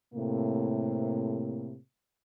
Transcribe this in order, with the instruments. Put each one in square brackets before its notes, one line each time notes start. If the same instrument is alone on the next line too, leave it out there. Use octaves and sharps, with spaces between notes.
[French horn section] A2 C3 A#3